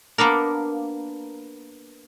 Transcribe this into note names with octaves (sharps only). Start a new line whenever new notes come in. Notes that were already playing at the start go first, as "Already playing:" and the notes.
A#3 B3 D4 A#4